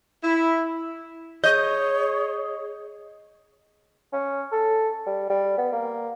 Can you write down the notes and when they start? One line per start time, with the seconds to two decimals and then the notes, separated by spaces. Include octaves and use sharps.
0.24 E4
1.44 G#4 C#5 D#5 G6
4.13 C#4
4.52 A4
5.06 G3
5.30 G3
5.58 B3
5.72 A#3